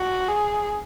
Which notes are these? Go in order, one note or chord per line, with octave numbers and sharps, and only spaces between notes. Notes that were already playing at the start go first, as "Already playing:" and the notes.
Already playing: F#4
G#4